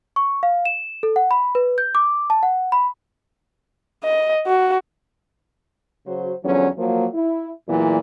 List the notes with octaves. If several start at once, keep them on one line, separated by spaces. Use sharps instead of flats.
C#6
F5
E7
A4
F#5
B5
B4
G6
D6
A5
F#5
B5
D#5
F#4
C#3 F#3 F#4 C5
E2 D3 F3 F#3 C#4
F3 F#3 A#3
E4
E2 A#2 E3 F#3 E4